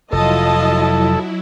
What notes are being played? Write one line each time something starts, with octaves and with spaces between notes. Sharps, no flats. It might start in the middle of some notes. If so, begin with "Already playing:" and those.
F1 F#3 E4 F4 A4 D#5 A5